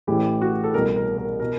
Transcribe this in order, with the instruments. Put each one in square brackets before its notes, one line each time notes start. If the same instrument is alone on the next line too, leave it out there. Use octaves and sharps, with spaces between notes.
[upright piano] A1 A2 E3 G4
F#4
A4
B2 A#4
C2
A#4
A#4
B2 A#4